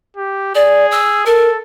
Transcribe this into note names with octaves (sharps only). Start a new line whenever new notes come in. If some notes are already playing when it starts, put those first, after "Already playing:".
G4
G#4 D5
E6
A4 A#4